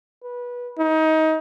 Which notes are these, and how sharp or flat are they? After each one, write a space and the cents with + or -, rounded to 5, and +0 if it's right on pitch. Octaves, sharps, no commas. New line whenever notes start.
B4 -20
D#4 +25